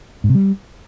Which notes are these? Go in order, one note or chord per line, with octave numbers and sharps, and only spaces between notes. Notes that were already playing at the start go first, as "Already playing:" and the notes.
G#2
C3
G3